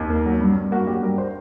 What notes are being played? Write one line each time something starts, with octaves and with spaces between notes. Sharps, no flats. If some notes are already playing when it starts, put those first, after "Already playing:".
Already playing: D#2
A#3
F#3
G2
G2
A#3 F#4
F#3 G4
G2 A#4
C5